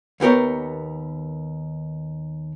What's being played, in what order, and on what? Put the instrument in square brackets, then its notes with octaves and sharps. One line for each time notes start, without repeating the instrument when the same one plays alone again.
[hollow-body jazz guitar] D#2 B3 G4 A#4 C#5